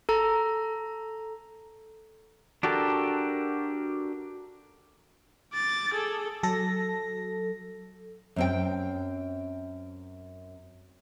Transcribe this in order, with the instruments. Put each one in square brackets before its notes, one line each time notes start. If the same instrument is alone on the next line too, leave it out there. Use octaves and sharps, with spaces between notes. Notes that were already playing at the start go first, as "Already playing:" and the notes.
[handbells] A4 A#5
[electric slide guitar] D4 F#4 G4 A4 A#4
[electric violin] D6 A6
G#4 A4
[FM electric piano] F#3 A4 A#6
[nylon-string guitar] F#2 C4 G5